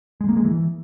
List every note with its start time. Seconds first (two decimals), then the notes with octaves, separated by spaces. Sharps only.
0.21 G#3
0.29 A#3
0.37 G#3
0.45 E3